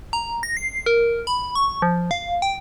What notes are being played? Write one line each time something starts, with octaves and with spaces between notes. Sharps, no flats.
A#5
A#6
C7
A#4
B5
C#6
F3
F5
G5